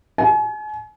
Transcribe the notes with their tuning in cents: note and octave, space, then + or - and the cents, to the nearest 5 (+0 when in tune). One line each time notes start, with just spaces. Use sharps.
G#5 +40